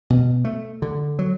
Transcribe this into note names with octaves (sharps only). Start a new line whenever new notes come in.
B2
A3
D3
F#3